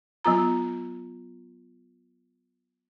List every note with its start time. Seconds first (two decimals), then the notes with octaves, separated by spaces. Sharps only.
0.25 F#3 B3 F4 A#5